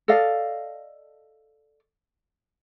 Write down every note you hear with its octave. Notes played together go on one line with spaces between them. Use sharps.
A4 D5 D#5 F5